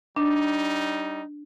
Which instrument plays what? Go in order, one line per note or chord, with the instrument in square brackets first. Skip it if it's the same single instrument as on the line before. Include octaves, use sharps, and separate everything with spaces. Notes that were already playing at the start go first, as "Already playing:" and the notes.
[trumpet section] G3 D#4 [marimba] D4